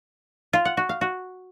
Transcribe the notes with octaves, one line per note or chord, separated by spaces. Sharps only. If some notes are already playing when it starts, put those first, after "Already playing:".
F4
F#5
F#4
F5
F#4